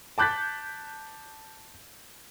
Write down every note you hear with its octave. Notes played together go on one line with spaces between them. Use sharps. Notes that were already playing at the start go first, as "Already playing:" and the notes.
A5 D6 F#6 G6 A6 B6